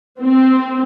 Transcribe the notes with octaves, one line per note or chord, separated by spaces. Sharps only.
C4